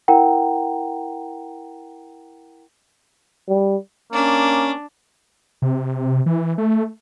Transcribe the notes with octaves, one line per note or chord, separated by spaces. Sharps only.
E4 A#4 F#5 G5 A#5
G3
A#3 C#4 D4
C3
E3
A3